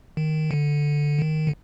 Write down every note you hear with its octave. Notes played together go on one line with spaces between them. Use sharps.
D#3
D3
D#3
D3